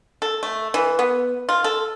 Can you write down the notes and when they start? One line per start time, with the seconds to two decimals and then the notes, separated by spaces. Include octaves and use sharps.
0.22 A4
0.43 A3
0.74 E3
0.99 B3
1.49 F4
1.64 A4